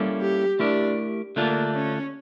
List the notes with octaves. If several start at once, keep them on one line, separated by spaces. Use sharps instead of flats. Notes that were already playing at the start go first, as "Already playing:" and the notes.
Already playing: G3 A#3 C#4 E4 A4
G4
A3 D4 E4 G4 A#4
D3 A3 A#3 D4 F4
C#4